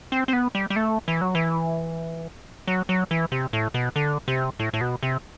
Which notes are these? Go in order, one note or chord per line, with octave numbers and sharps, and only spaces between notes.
C4
C4
B3
G3
G3
A3
E3
F#3
E3
F#3
F#3
E3
C3
A2
B2
D3
C3
A2
A2
B2
C3